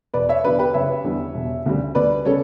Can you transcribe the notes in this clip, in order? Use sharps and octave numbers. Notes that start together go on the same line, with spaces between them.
E1 B4 D5
C#5 E5
E2 D3 F#3 B4 D5
G4 B4
F#1 C#5 E5
E2 D3 G3
E1
D2 C#3 G3
D2 B4 D5
C#3 G3 C#4 A4 C#5